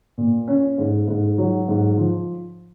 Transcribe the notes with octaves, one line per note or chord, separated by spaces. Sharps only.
A#2
C#4
G#2
G#2
F#3
G#2
F3